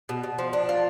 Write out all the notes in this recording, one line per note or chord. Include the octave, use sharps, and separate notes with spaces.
B2
B2
F3
D4
F4